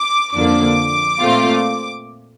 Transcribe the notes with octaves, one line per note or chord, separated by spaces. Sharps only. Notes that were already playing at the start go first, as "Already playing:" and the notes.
Already playing: D6
F2 D3 F3 A#3 D4 D6
A#2 A3 C4 F4